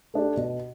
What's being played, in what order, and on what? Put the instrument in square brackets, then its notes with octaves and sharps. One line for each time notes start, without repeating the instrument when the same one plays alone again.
[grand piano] A3 D4 G4
B2